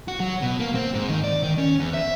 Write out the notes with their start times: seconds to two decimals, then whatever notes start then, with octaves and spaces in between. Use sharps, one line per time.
0.08 F#4
0.20 F#3
0.42 B2
0.60 A#3
0.75 C4
0.94 G#2
1.09 D#3
1.24 D5
1.43 D#3
1.58 C#4
1.80 E2
1.94 E5